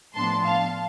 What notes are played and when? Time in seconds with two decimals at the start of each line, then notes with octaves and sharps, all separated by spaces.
0.15 A2 F3 B3 D4 A5 C6
0.44 F5 A5